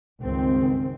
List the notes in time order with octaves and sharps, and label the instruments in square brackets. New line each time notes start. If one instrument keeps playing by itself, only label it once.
[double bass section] C#2 G2 D#3 C4